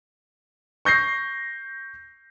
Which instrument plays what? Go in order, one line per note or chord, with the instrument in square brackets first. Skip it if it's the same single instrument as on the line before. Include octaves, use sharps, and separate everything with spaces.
[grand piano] C#6 G6 A#6 C7